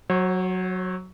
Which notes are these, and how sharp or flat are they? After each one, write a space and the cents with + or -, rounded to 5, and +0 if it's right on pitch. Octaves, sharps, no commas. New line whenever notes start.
F#3 +0 C#5 -40